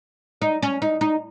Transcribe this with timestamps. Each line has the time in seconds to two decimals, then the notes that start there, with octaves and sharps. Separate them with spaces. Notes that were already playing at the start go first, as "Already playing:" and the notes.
0.42 D#4
0.62 C#4
0.82 D#4
1.01 D#4